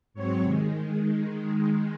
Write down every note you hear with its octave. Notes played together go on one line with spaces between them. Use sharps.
G#2 F#3 C4 C#5
C3 D#3 G#3